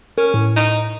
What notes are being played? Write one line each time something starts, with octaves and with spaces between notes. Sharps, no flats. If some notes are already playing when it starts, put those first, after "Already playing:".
C#4 A#4
A2
D#4